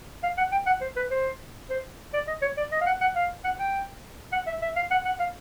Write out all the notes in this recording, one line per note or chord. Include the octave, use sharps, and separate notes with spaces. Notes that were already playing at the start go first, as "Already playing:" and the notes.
F5
F#5
G5
F#5
C5
B4
C5
C5
D5
D#5
C#5
D5
D#5
F5
F#5
F#5
F5
F#5
G5
F#5
E5
E5
F5
F#5
F#5
F5